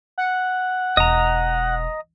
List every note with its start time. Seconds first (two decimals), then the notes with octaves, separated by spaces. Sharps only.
0.18 F#5
0.97 E1 D#5 A#5